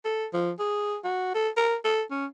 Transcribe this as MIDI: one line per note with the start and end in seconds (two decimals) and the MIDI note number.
0.05 0.27 69
0.34 0.51 53
0.59 0.97 68
1.04 1.34 66
1.34 1.49 69
1.57 1.76 70
1.85 2.02 69
2.11 2.26 61